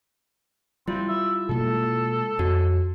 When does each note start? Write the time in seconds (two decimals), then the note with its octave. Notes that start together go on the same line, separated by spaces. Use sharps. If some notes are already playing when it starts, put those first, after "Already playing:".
0.88 G3 C4 E4 F4
1.08 E5
1.49 B2 G#3 A#3 A4
2.39 F2 F#4